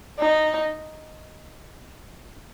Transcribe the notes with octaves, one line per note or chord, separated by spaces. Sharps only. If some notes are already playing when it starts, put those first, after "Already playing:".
D#4